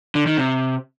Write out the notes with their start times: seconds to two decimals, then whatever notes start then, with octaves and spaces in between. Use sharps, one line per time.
0.15 D3
0.26 D#3
0.38 C3